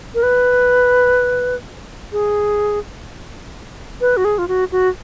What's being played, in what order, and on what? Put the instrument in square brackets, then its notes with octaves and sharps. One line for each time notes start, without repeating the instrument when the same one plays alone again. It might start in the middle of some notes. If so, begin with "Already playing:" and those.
[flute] A#4
B4
G#4
B4
F#4
G#4
F4
F#4
F#4